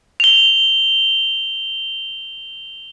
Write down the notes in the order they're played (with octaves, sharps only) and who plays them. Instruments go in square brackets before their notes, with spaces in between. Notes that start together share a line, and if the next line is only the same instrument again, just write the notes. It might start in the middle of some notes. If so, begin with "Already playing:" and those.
[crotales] F7 G7